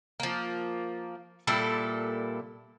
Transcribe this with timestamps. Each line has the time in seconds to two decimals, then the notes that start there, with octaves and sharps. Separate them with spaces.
0.20 F3 A#3
1.47 A#2 G3 E4 A4